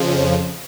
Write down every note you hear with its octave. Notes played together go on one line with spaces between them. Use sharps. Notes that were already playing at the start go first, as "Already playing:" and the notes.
Already playing: F2 C#3 F3